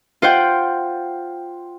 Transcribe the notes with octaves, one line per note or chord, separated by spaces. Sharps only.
F4 C5 F#5 G5